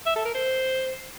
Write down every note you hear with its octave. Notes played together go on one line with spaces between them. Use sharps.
E5
A4
A#4
C5